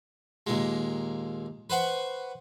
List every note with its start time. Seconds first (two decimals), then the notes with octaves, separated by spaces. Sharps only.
0.47 D#2 A#2 G#3
1.70 B4 C5 F#5 C#6